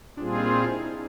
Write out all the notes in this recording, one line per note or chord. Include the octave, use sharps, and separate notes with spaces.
A#2 G3 C4 D4 F4 G#4
D#4
E4
E4
G#4